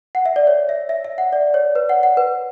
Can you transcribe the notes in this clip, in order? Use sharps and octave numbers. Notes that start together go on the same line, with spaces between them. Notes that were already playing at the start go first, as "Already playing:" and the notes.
F#5
E5
D5
C#5
E5
E5
E5
F#5
D5
C#5
B4
F#5
F#5
B4